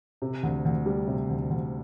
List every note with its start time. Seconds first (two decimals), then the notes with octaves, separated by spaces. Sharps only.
0.22 C3
0.43 D2
0.65 D2
0.86 G3
1.07 C3
1.29 D2
1.50 D2